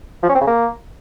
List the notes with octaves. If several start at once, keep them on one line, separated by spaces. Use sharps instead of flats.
F3
C#4
C4
C#3
A#3